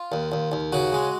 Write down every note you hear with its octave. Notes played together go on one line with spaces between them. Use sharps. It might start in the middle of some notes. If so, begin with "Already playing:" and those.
Already playing: F4
D#2
D#2
D#2
C#3 F#4
G#3